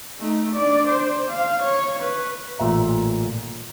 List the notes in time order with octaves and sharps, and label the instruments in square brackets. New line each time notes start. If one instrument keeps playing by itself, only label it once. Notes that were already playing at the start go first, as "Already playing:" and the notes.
[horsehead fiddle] A3 D#4
D4 D5
C5
F5
C#5
B4
[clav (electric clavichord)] A1 A#2 E5 A#5